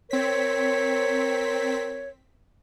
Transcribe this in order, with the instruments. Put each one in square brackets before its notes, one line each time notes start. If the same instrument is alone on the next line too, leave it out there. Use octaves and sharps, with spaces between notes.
[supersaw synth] C4 B6 [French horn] A#4 [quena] C#5